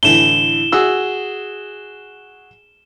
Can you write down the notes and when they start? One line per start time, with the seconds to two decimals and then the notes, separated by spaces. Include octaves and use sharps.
0.03 A2 D3 E3 E7 G7
0.72 F#4 G#4 E6